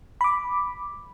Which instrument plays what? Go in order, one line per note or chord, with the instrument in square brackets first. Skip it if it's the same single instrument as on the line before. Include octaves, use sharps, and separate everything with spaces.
[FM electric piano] B5 D6